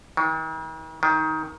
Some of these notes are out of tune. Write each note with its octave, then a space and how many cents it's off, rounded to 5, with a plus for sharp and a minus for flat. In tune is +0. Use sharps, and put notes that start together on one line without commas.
D#3 +45
D#3 +20